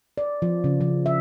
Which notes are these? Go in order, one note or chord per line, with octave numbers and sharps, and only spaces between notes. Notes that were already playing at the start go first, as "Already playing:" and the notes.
D5
F3
C#3
F3
E5